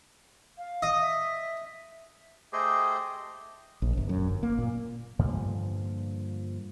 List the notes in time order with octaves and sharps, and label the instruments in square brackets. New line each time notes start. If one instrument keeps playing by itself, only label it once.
[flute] F5
[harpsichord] D#5
[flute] E5
[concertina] A3 G4 G#4 C5 D#5 G5
[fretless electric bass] A#1
G1
F#2
G1
A#3
A#2
[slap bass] G2 A#2 D3 F3